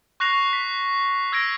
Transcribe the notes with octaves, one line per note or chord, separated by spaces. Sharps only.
C#6 F#6 A#6 C7 F7
B6
E6 G#6 A#6 D7